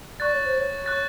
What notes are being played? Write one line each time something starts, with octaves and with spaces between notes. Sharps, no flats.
D5 C#6 F#6 A6
C#5
C5
C#5
C#6 F#6 A6